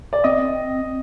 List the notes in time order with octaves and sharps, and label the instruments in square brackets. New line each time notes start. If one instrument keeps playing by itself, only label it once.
[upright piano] D5
[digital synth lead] C4 [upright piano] D#5